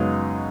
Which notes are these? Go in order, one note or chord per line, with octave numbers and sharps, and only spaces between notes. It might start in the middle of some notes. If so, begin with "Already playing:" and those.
Already playing: F#2 C#3 G#3 B3 D#4